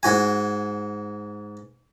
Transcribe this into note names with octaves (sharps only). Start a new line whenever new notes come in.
G#2 F#4 G#5